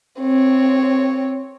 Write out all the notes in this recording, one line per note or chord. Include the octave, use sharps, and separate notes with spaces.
C4 C#5